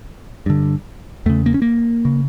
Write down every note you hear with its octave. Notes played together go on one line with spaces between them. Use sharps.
G2 D3
E2 C#3 A3
A#3
C#4
A#3
C#3